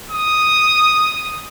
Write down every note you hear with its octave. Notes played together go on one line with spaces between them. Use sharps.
D#6